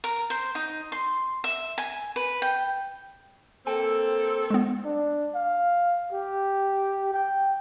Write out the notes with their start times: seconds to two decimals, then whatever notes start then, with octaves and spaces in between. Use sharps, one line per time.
0.04 A#4
0.30 C5
0.55 D#4
0.92 C6
1.44 E5
1.78 G#5
2.16 B4
2.42 G5
3.67 A#3 C4 A4 G5
4.50 G#3 B3
4.85 D4
5.35 F5
6.13 G4
7.14 G5